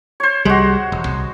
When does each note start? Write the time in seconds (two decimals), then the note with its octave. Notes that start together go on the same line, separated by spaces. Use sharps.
0.20 C5 C#5
0.45 C2 G3 G#3 F#4
0.92 E1
1.06 C2